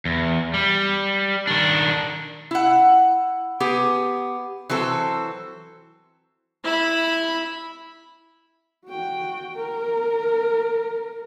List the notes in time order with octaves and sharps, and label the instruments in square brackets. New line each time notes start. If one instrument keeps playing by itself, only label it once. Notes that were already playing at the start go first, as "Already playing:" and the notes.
[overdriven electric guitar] E2
G3
D#3 D4
[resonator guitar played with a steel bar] E4 F#5
B3 G4 G#4
E3 F#3 C4 A4
[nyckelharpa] E4 B5
[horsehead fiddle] F#4 G5
A#4